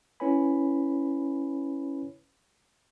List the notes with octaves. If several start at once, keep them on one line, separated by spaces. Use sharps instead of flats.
C#4 E4 B4 C#5 G#5 B5